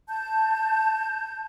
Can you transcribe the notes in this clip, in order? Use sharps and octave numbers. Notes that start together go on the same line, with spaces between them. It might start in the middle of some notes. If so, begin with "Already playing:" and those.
A5 G6